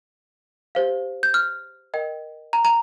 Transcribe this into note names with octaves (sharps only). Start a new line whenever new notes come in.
G4 C5 F5
G6
F6
A#4 D#5 G5
A#5
A#5